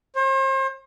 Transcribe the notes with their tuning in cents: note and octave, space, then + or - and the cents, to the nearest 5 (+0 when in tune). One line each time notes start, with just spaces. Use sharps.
C5 +40